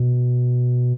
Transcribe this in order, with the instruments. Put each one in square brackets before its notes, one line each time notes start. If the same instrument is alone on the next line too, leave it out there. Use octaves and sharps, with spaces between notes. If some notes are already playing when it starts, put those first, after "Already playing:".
Already playing: [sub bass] B2